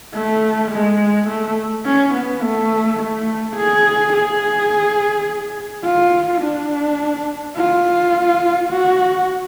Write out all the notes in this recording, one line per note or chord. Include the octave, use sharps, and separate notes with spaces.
A3
G#3
A3
C#4
B3
A3
A3
G#4
G#4
F4
D4
F4
F#4